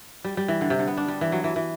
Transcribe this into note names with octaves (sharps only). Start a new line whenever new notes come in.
G3
G3
E3
D3
C3
D3
B3
D4
G3
E3
F#3
E3
E3